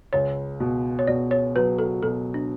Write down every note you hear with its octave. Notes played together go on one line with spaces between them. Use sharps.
C#2 C#5
B2
C#5
B2 D5
C#5
F#3 B4
A4
B2 A4
D4